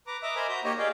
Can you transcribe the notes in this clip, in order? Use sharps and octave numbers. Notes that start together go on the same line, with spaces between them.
B4 A#5 D6
D#5 E5 A#5 D6
A#4 C5 G#5 A#5 B5
F#4 A#5 G6
A#3 D#4 G4 C#5 D#5
G4 G#4 D5 F5 G5